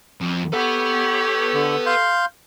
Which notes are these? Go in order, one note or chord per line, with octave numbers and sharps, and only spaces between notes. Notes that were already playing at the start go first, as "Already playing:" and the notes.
F2
G4 A4 B4 C#5 F#5
D3
F5 C6 G6